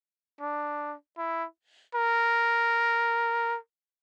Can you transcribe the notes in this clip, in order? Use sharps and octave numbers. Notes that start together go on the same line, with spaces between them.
D4
E4
A#4